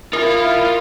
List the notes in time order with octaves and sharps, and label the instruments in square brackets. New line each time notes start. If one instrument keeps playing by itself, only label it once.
[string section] E4 [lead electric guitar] F4 [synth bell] A#4 F5